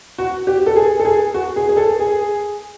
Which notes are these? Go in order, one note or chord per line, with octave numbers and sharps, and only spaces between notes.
F#4
G4
A4
G#4
A4
G#4
F#4
G#4
G#4
A4
G#4